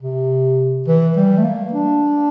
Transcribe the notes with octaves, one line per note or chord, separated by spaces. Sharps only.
C3
E3
G3
A3
A#3
D4